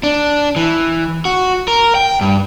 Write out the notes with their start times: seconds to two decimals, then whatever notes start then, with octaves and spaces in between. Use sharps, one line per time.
0.03 D4
0.56 E3
1.25 F#4
1.68 A#4
1.95 G5
2.21 G2